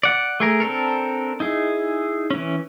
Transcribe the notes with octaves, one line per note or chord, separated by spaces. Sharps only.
D5 F#5
A3 G#4 A#4
C4 D4 A4 A#4
D#4 E4 G#4
E3 C#4